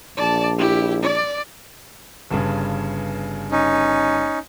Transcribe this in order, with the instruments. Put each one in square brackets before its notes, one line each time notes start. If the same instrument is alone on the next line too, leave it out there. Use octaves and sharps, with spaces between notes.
[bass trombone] A#1 [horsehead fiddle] D5 A5
[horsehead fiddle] E4 G4
D5
[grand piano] G1 G2 C#3
[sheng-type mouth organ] C#4 D#4